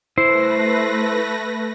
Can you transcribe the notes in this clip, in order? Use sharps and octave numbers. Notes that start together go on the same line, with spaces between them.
A3 E4 B4 C5 A#6